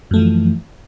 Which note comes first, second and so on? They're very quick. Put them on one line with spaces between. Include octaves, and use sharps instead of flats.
F#2 A3 F3 E3